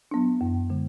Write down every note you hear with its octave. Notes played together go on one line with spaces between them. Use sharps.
F#3 B3 D4
F#2
D3 G#3